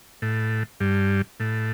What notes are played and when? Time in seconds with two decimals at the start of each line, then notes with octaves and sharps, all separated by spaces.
0.22 A2
0.80 G2
1.40 A2